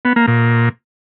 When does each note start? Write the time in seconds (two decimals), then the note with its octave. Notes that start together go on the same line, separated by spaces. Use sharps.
0.05 B3
0.16 A#3
0.28 A#2